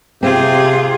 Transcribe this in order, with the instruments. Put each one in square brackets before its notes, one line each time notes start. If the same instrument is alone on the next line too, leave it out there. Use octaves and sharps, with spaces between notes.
[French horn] C3 [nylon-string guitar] C4 [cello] F4 G#4 [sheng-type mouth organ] G4